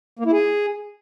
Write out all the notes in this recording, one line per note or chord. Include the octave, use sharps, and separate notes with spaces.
A#3
E4
G#4